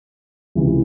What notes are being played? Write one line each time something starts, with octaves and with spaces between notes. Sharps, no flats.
C#2 C3 E3